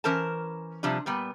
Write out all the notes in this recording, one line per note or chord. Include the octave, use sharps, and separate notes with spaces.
E3 C#4 A#4 C5 A5
C3 F3 G3 D4
A#2 G3 B3